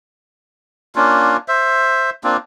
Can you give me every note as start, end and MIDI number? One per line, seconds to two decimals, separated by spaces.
0.96 1.37 58
0.96 1.37 61
0.96 1.37 62
0.96 1.37 65
1.48 2.10 72
1.48 2.10 76
2.24 2.37 58
2.24 2.37 60
2.24 2.37 62
2.24 2.37 65